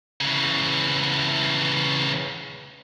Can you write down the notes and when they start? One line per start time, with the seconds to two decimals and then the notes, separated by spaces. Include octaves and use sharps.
0.21 C#3 E3